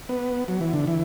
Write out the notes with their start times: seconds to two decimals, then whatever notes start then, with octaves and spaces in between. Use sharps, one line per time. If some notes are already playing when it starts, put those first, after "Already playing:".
0.09 B3
0.48 F#3
0.61 E3
0.73 D3
0.87 E3